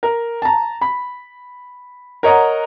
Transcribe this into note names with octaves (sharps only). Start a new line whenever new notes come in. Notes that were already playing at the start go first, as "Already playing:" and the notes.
A#4
A5 A#5
B5
A#4 C#5 D#5 F#5 A#5